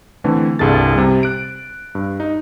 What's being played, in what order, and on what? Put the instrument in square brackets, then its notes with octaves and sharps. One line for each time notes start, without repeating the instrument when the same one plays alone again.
[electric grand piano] D3 E3 A3 C4
C2 G2 G#4 A4 A6
C3 G3
F#6 D7
G2
D#4